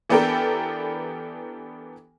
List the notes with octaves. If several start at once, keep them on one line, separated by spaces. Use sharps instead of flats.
E3 B3 D4 G4 A4 A#4